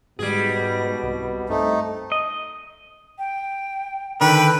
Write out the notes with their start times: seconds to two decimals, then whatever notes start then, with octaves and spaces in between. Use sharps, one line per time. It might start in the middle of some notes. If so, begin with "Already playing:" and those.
0.19 G#2 B2 G3 G#4
1.03 C2
1.49 G2 A3 C4 D#4
2.12 D#5
3.19 G5
4.21 D3 D#3 B4 G5